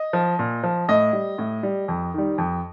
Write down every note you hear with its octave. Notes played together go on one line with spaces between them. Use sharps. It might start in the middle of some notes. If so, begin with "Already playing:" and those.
Already playing: D#5
F3
A#2
F3
A2 D#5
G3
A2
G3
F2
D#3 G3
F2